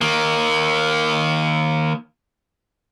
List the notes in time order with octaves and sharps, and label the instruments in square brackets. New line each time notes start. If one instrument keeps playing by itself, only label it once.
[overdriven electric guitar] D#3 A#3